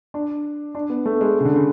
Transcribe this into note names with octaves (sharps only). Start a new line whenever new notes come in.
D4
D4
B3
A3
G#3
C#3
D3
C#3